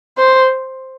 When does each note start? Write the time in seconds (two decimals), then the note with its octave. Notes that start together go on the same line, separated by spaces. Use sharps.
0.18 C5